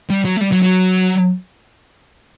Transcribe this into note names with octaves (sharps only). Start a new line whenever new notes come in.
G3
F#3
A3
G3
F#3
F#3